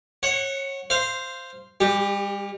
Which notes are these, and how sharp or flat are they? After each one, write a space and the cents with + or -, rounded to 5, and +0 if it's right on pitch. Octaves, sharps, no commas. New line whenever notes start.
C#5 -25 F#5 +5
C5 +0 F5 -15
G3 +40 G4 +0